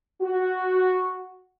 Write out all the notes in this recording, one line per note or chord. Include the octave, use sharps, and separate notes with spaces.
F#4